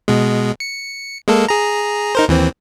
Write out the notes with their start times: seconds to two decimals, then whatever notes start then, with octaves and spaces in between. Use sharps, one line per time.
0.08 B2 G#3
0.60 C#7
1.28 G#3 A#3 A4
1.49 G#4 A#5
2.15 D#4 A#4 C5
2.28 D#2 E3 C4